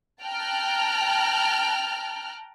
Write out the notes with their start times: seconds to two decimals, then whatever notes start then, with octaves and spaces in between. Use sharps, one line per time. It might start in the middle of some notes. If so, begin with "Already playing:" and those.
0.22 G5 A5 A#5 F6 F#6